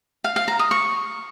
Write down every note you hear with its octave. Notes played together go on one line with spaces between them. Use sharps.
F5
F5
A#5
D#6
C#6